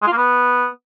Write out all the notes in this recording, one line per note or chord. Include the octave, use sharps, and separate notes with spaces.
G#3
F4
A#3
B3